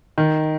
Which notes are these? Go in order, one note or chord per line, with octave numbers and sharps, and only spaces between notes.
D#3